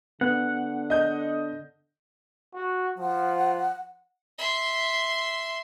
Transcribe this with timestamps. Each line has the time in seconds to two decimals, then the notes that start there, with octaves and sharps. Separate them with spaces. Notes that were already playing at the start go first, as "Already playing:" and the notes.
0.21 D3 B3 F#5
0.90 D#5 G6
2.55 F#4
2.99 F3 F#5
4.39 E5 C6